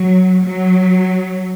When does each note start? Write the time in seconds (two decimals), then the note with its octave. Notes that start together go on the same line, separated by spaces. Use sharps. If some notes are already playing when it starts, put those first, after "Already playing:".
Already playing: F#3
0.43 F#3